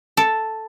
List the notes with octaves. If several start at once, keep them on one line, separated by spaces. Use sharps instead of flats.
A4